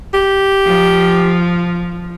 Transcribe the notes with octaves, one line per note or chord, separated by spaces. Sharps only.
G4
F3